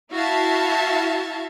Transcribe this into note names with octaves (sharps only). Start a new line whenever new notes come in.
E4 F#4 E5 F5 A5